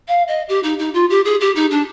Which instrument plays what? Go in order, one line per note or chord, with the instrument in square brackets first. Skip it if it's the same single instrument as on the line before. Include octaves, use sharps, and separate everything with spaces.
[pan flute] F5
D#5
G4
D#4
D#4
F4
G4
G#4
G4
D#4
D4